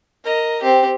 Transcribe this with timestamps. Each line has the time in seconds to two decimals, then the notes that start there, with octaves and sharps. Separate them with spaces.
0.24 A#4 D#5
0.62 C4 G4